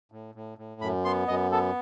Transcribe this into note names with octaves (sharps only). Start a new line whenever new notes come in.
A2
A2
A2
F#2 B5
B3 C6
F#2 D#5
B3 A4